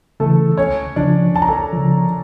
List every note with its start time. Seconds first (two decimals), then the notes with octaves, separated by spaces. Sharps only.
0.20 C#3 E3 A3 A4
0.57 C#2 C#4 C#5
0.96 C#3 F3 D4 D5
1.35 C#2 A5
1.42 A#5
1.49 A4 A5
1.73 C#3 F3